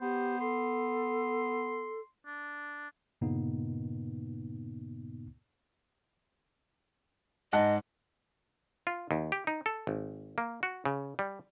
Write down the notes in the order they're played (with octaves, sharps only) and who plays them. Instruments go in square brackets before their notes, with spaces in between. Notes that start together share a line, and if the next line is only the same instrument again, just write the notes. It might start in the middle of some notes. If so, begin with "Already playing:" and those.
[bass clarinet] B3 [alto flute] G4 [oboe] C5
[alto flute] A4 [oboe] C6
[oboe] D4
[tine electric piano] G2 A#2 C#3 A#3 B3 D#4
[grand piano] G#2 F#5 A5 [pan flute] D#5
[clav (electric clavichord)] F4
D#2
G4
D#4
A4
G#1
A#3
F#4
C#3
G3